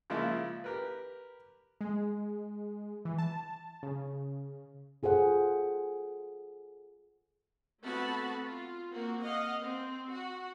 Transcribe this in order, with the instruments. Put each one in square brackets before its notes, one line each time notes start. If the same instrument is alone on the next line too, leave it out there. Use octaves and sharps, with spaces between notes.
[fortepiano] C#3 F3 G#3 A#3 E4
G4 A#4 B4
[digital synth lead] G#3
E3
A5
C#3
[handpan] F4 G#4 A4 C5 F#5
[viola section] A3 B3 C4 F#4 A5 B5
F4
A#3 C4 F#4
D#5 F5 F#5
C4
F#4